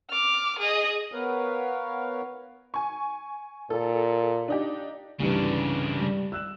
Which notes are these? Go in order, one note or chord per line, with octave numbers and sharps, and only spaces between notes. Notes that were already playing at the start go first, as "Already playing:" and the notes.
D6 F6
G#4 D#5
B3 A#4 B4 C#5 F5
G#5 C#6
A#2 A4
D4 D#4 G4
C2 G2 C#3 E3 D4
G3
E6 F#6 E7